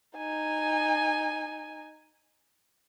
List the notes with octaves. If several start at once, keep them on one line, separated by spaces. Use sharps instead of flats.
D#4 G#5